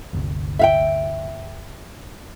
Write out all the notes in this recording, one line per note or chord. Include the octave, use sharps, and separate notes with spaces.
G1 D2 C3
E5 F5 G5